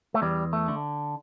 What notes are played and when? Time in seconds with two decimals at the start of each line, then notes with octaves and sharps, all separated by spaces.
0.14 A3
0.22 E2 G3
0.53 A3
0.68 D3